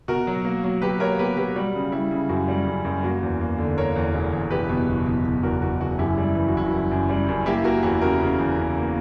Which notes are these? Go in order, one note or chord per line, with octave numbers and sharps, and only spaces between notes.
B2 F#4 A#4
F#3
A#3
F#3
F#3 G4 B4
A#3 A#4 C#5
B2 G4 B4
F#3 G4 B4
G3 F#4
C#3
G3 E4
C#3
F#2 F#4
G3
F#2
F#2
A#3 F#4
E2
A#3
D3
A#3 A#4 C#5
E2
E1
E2
F#1 G4 B4
B2
F#1
B2
B2
E2 F#4 A#4
B2 F#4
F#1 F#4
F#2 E4 G4
G3
E4
E3
F#4
F#1 E4
F#4
F#2
F#2
G3
F#2
A#3 E4 G4
A#3 F#4 A#4
E2 E4 G4
C#3 F#4 A#4
C#3
E2
C#3
A#3